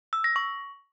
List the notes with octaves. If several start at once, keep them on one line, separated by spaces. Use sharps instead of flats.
E6
A#6
C#6